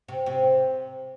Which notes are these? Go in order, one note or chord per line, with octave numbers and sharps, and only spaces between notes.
C3
C3